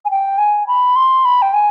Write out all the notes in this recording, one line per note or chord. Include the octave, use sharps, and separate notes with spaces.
G#5
G5
G#5
B5
C6
B5
G5
G#5